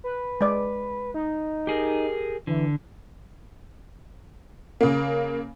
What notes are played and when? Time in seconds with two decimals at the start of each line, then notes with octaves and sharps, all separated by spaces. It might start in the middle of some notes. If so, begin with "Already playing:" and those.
0.04 B4
0.41 G#3 D5
1.14 D#4
1.67 G4 G#4 A#4
2.47 D3 E3
4.81 C#3 A#3